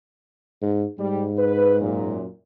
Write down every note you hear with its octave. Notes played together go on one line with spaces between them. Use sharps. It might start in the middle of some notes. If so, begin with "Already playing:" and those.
G#2
G#2 G3
B4
F#2 A#2